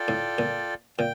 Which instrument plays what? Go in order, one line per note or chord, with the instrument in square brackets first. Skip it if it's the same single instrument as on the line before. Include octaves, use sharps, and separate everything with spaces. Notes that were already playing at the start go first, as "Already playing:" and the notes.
Already playing: [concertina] F4 A4 D5 G5
[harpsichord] A2
A#2
[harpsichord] A#2 [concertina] G5